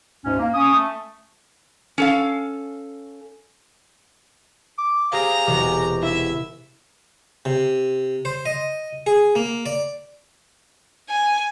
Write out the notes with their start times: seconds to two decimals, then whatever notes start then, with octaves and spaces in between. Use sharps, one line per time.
0.24 D2 G#2 B2 C#4
0.39 A#3
0.54 C#4 D#6
0.74 A3
1.98 C#4 A4 F5
4.78 D6
5.12 G4 G#4 C5 F5 A#5
5.47 E1 C3 F#4 G4
6.02 E4 E5
7.45 C3
8.25 C5
8.46 D#5
9.07 G#4
9.35 A#3
9.66 D5
11.10 G#5